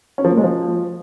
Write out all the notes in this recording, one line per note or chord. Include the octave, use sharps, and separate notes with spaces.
C#4
F3
A#3
G#3
F3